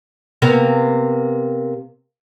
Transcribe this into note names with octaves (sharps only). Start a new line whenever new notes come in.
C3 A#3 B3